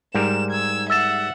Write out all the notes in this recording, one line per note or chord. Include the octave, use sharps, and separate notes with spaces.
G#2 G3 A#4 E7
E6 G#6
E5 F#5 E6 A6 E7